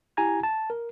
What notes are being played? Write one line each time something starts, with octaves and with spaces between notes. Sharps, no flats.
E4 G4 G#5 A#5 G#6
A5
A#4